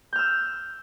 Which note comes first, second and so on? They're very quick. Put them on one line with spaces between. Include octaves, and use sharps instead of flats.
G6 F6 E6